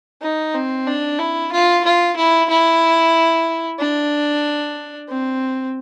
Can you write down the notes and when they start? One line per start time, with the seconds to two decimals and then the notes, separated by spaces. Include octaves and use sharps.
0.22 D#4
0.54 C4
0.87 D4
1.19 E4
1.52 F4
1.85 F4
2.16 E4
2.49 E4
3.79 D4
5.09 C4